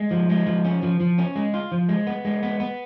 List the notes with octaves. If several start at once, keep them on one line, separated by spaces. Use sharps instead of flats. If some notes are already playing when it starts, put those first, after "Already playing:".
Already playing: G#3
F3
G#3
F3
C#4
F3
F3
C#4
G#3
F4
F3
G#3
B3
G#3
B3
B3